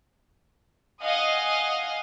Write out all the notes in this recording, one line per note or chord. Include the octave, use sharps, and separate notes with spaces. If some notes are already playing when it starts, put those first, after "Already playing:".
D#5 F5 F#5 G#5 D#6